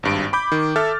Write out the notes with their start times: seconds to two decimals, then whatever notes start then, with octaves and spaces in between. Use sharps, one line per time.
0.03 G#1 G2 D7
0.33 B5 D6 G6
0.52 D#3
0.76 A4 E5 F6 A6